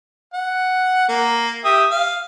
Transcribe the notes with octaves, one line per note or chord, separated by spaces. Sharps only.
F#5
A#3
G4 E5 D#6
F5